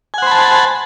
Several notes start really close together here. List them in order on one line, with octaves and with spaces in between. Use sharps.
G#5 F#5 C5 B5 A5